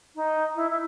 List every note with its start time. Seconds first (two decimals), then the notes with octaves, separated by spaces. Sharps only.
0.16 D#4
0.55 E4
0.71 E4